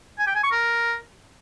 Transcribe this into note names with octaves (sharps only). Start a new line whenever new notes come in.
G#5
G5
G#5
C#6
A#4